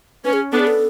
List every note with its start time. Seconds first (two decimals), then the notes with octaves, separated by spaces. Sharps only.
0.24 C#4 B4
0.33 G#4
0.52 B3 D4 A4
0.59 G#4
0.67 A4